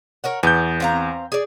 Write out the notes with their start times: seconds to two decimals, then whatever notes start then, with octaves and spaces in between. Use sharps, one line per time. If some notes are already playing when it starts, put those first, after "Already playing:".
0.24 A#4 C#5 F#5
0.43 E2 B3 G6
0.80 C4 F5 A#5
1.32 G#4 D5